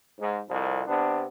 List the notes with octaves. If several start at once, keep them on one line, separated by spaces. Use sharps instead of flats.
G#2
C2 F2
C3 B3 D4